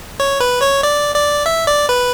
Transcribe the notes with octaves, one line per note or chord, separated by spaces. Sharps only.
C#5
B4
C#5
D5
D5
E5
D5
B4